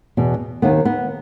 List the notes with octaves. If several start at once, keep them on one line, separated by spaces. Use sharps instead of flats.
E2 B2
D#2 D#3 B3
B3